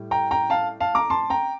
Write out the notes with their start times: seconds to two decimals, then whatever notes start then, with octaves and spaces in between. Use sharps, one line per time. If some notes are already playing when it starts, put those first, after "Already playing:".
Already playing: A2 G3
0.11 G5 A#5
0.31 G5 A#5
0.50 F5 A5
0.80 F5 A5
0.95 A#5 D6
1.10 A5 C6
1.30 G5 A#5